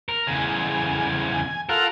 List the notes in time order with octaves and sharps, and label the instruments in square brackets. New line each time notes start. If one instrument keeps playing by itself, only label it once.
[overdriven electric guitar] A#4
[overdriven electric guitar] E2 C#3 [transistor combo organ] G#5
[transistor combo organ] F4 A4 F#5 [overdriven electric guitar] A#4